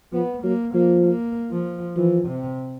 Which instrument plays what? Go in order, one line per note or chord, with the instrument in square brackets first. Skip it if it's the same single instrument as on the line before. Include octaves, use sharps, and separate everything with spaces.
[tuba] F3 [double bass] B3
[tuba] F#3 [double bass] A#3
[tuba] F3 [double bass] A#3
[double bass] A#3
F3
[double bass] E3 [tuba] F3
[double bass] C3